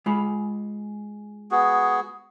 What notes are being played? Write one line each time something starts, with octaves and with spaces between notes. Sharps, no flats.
G#3 F4 B5
B3 F#4 G#4